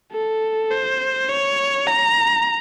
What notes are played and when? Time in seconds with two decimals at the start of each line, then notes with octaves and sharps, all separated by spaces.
0.12 A4
0.70 C5
1.29 C#5
1.87 A#5